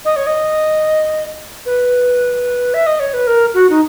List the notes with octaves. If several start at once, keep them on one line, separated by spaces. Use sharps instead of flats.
D#5
C#5
D#5
B4
E5
D#5
C#5
B4
A#4
F#4
D#4